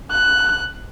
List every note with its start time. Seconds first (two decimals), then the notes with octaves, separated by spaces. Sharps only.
0.11 F#6